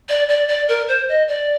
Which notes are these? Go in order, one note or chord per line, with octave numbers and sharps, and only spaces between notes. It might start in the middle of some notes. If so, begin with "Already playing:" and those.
D5
D5
D5
A#4
C5
D#5
D5